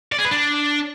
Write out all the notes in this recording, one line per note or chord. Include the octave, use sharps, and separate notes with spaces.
D5
G#4
B4
D4